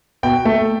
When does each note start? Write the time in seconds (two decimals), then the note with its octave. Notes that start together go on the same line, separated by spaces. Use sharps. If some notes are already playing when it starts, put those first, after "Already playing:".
0.23 B2 G5
0.45 A3